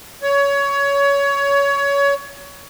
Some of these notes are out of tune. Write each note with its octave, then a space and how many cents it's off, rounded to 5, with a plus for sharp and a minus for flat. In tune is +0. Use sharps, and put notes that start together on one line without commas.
C#5 +20